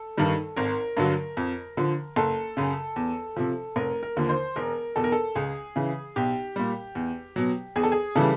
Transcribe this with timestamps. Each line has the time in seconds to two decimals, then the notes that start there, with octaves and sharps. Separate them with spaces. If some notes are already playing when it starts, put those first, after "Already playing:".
Already playing: A4
0.17 G2 D#3 G3
0.56 G#1 A#4
0.97 G2 D3 F#3
1.37 F2
1.77 D3 F3
2.16 F#1 A4
2.57 F#2 C#3
2.96 E2
3.37 C3 F3
3.76 F1 A#4
4.03 A#4
4.17 D#2 D3 F3
4.29 C5
4.56 E1 A#4
4.96 E2 B2 A4
5.04 A#4
5.12 A4
5.35 C#2 G#4
5.76 C#3 E3
6.16 B1 G4
6.56 A#2 G3
6.95 E2
7.36 B2 F#3
7.76 E2 G#4
7.83 A4
7.92 G#4
8.15 C#3 E3 G3 A4